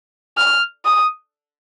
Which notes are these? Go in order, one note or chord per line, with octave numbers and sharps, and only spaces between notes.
F6
D#6